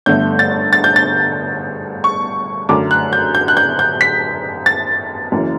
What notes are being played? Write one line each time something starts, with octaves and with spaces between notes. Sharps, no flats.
G1 G2 D3 A3 G6
A6
A6
G6
A6
C#6
F#2 D3 A3 D6
F#6
G6
G6
F#6
G6
G6
B6
A6
F#1 F#2 E3